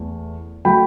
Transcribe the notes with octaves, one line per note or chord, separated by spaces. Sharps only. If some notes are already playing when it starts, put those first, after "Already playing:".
Already playing: E2 A3
F#3 A3 G5 B5